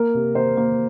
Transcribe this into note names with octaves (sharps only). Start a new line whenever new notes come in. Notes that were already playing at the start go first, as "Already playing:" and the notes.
Already playing: A#3 A#4
C3
A#3 C5
A#3